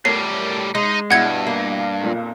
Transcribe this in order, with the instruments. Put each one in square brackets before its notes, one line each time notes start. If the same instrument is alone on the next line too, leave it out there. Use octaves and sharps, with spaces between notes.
[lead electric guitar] A2 G3 [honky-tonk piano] A3 A#4 C#5 [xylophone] C7
[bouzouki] G#3 [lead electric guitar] D#4 D#5
[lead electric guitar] G2 [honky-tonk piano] B2 E4 [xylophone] F#5 G#6 C#7
[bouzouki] A#3
[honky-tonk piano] B1 F2 A#2